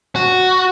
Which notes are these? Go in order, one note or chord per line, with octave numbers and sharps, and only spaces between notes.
F#4